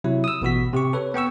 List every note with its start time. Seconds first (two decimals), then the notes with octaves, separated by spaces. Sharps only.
0.04 C3 F#3 E4
0.24 D#6 E6
0.42 A1 B2 F#4 B6
0.73 C3 G4 C#6
0.93 A4 B4 C#5
1.14 B3 G5 C#6 E6